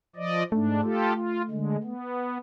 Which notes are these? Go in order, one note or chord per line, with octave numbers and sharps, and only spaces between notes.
F3 D5 D#5
G#2 A3 D4
F4 G4 A4
F4
D3 G#3
B3